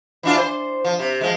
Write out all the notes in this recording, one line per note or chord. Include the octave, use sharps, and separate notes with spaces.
E3 D4 F4
C5
F3
C3
F3 G#3